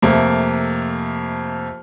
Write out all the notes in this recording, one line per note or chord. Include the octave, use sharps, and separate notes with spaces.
F2 C3 A3 A#3